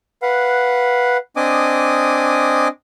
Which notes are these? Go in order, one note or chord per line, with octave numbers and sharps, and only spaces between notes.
B4 F5 F#5
C4 D4 D#5 G#5 D6 D#6